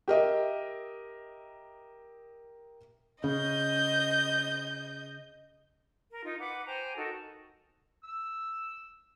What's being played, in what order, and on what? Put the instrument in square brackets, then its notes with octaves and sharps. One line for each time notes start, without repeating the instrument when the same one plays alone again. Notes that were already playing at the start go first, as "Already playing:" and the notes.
[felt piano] G4 A#4 D#5 E5
[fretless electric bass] C#3 [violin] D#5 G6
[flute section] A#4
D#4 F4
B4 F#5 D6
C5 G5 G#5 A#5
D#4 F#4 A4 A#4
[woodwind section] E6